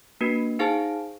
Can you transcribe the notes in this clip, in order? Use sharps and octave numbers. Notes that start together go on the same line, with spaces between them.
A#3 D4 F#4 B4
D#4 G#4 C5 F5 A5